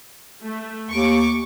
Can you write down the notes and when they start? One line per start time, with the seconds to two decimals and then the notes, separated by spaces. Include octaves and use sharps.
0.43 A3
0.91 D#2 C#6 D6